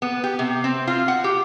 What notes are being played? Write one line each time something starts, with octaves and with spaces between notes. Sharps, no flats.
B3
G4
C3
C4
F4
F#5
G4